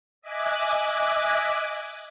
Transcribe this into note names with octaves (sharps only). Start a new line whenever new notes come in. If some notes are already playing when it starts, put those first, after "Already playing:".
D#5 E5 G#5 D6 F#6